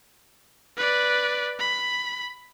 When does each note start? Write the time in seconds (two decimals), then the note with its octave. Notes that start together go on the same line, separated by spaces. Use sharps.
0.77 B4 D5
1.59 B5